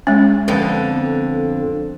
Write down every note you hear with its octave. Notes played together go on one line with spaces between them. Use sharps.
G#3 C#4
F2 D3 B3